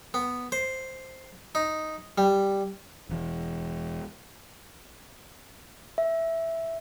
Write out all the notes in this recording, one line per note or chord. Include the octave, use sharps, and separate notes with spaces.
B3
C5
D#4
G3
E1 E3
E5